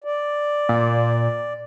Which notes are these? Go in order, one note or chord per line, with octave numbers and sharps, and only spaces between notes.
D5
A#2